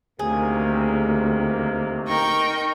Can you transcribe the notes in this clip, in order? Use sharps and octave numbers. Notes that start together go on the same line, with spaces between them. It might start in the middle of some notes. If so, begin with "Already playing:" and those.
D2 C3 D#3 A#3 G#4
D#4 A#4 G5 C#6